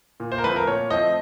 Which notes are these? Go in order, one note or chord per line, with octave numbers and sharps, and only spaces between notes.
A#2
C5
A#4
F3 A3 C4 B4
A#4
A#2 C#5
F3 A3 C4 D#5